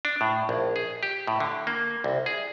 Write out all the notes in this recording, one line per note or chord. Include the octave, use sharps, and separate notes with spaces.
D4
A2
A#1
G#4
G4
A2
D3
A#3
C2
G#4